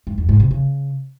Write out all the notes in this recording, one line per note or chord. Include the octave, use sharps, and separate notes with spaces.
G#2
F2
G#2
C3
C#3